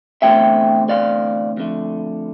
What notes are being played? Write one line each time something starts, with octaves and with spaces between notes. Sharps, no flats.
E2 D3 A3 C4 E5 G5
D5 F5
F2 D3 A3